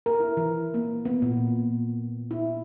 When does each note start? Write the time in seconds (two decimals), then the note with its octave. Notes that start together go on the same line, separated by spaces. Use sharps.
0.06 A#4
0.20 E4
0.37 E3
0.74 A#3
1.05 B3
1.22 A#2
2.31 E4